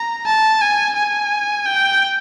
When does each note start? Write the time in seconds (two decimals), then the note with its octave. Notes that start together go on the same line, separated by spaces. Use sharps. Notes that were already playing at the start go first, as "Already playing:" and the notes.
Already playing: A#5
0.27 A5
0.61 G#5
0.96 G#5
1.66 G5